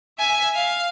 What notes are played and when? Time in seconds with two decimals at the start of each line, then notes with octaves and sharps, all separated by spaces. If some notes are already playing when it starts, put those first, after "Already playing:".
0.18 E5 G#5
0.55 F5